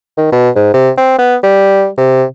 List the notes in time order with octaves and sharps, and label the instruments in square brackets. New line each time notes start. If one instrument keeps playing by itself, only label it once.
[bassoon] D#3
B2
G#2
C3
C4
B3
G3
C3